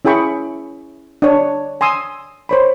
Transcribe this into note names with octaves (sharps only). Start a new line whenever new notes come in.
C#4 E4 G#4 G5 B5 C#6
D4 C#5
G#5 C6 D#6 E6
C5 C#5 B5